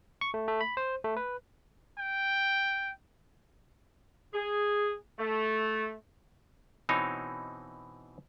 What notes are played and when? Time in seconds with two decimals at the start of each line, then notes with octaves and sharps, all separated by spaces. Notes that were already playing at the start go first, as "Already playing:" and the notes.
0.21 C#6
0.34 A3
0.48 A3
0.61 B5
0.77 C5
1.04 A3
1.17 B4
1.98 G5
4.34 G#4
5.18 A3
6.89 B2 E3 C4 D#4 C#5